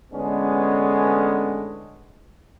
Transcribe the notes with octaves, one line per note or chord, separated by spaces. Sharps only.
A1 D3 G#3 B3 C#4 D4